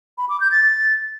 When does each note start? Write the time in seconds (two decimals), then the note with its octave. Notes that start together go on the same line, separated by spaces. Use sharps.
0.18 B5
0.29 D6
0.40 G6
0.52 A6